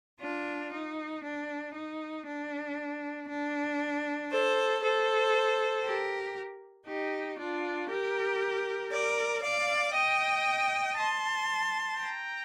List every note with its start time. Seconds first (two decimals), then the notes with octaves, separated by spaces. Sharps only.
0.20 D4 F4
0.73 D#4
1.23 D4
1.74 D#4
2.26 D4
3.28 D4
4.30 A4 C5
4.82 A4 C5
5.83 G4 A#4
6.86 D#4 G4
7.38 D4 F4
7.89 G4 A#4
8.91 A#4 D5
9.42 D5 F5
9.93 D#5 G5
10.96 A5 C6
11.98 G5 A#5